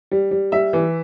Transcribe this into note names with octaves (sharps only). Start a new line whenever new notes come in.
G3
G3
G3 E5
E3